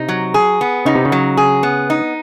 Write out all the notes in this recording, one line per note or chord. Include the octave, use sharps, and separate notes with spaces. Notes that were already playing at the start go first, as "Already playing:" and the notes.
Already playing: C3 D#4
F#3
G#4
B3
C#3 D#4
C3
C#3
F#3
G#4
B3
D#4